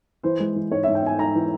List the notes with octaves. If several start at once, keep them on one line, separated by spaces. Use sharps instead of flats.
E3 C5
G#3
E3
G#2 C#5
E5
G#2
G5
G#2 G#5
G#2 A#5
E3